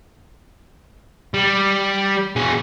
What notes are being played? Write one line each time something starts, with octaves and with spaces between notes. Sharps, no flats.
G3
B2 G#4